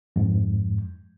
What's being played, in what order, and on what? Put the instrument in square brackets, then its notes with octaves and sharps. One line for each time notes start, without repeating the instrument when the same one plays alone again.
[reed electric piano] F2 G#2